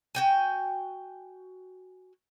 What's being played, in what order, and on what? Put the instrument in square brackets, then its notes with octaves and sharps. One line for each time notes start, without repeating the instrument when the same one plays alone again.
[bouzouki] F#4 G5 G#5